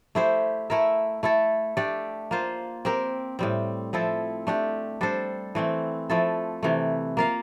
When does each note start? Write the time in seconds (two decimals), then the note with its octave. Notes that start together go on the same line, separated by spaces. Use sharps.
0.15 A3 E4 G4 C5
0.70 A3 E4 A#4 E5
1.23 A3 E4 A4
1.77 A3 D4 G4 D5
2.31 A#3 F4 C5
2.85 C4 G4 A#4
3.39 A2 G3 C4
3.93 F3 C4 E4 A4
4.47 A3 D4 G4
5.01 G3 D4 A4 C5
5.55 E3 A3 C4
6.10 F3 A3 E4 A4
6.63 C3 E3 A3
7.17 A#3 F4 A#4 F5